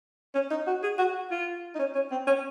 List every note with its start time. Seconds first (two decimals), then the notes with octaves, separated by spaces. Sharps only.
0.35 C#4
0.51 D#4
0.67 F#4
0.83 G#4
0.98 F#4
1.31 F4
1.75 D#4
1.79 C#4
1.95 C#4
2.11 C4
2.27 C#4